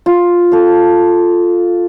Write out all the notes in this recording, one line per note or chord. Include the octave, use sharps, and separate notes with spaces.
F4
A4 F5